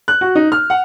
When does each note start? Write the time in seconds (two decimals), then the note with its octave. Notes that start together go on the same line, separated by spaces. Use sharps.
0.08 F#6
0.21 F#4
0.35 D#4
0.52 F6
0.70 F#5